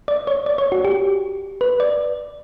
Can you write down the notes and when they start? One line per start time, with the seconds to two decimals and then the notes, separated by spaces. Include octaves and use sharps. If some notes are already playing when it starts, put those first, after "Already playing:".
0.08 D5
0.27 C#5
0.46 D5
0.58 C#5
0.72 F#4
0.85 G4
1.61 B4
1.80 D5